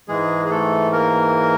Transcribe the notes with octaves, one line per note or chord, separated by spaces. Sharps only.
G#2 E3 G#3 G#4
G#4
A3 A4
A#3 A#4